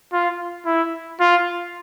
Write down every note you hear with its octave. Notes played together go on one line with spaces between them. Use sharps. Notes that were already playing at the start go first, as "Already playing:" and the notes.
F4
E4
F4